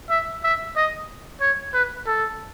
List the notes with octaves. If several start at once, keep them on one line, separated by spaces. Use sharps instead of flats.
E5
E5
D#5
C#5
B4
A4